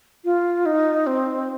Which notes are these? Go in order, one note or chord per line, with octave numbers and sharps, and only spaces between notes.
F4
D#4
C4